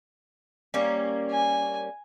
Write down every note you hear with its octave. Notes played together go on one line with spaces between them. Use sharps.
G3 A#3 C#4
G#5